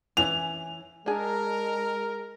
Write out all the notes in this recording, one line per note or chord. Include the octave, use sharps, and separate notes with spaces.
E3 C#4 F7
G#3 D4 G#4 A#4